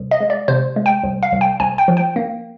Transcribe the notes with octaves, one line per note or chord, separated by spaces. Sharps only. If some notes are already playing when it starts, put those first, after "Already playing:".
Already playing: C2
D#5
G#3
D5
C3 C5
G#3
G5
C2
F5
C2
G5
C2 G#5
G5
F3
G5
A#3